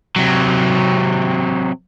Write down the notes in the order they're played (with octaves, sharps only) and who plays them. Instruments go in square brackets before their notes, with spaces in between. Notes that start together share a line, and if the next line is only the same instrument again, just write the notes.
[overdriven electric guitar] C3 F#3